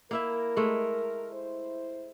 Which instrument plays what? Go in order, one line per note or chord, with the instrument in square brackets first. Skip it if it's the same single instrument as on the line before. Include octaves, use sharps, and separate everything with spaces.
[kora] A#3 E4 E5 [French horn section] A#4
[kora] G#3 A3
[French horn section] E4 C5